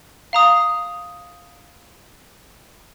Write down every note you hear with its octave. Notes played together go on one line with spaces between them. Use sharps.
F5 A#5 D#6